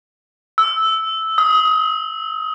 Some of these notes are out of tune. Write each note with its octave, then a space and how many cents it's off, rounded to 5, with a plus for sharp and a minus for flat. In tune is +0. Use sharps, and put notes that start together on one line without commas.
E6 -10
D#6 +25